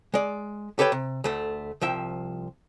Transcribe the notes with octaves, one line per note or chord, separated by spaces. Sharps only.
G#3 D5
G4 A4 B4 C#5 G5
C3
D2 A3
C2 F3 E5 G5